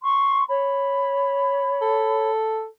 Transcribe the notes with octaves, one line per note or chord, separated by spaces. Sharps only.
C6 C#6
C#5 B5
A4